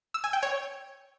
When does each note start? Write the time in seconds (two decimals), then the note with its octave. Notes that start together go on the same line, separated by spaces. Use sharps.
0.14 E6
0.24 G#5
0.33 G5
0.43 C#5